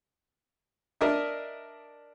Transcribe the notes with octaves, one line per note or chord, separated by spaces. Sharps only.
D4 A#4 D#5 E5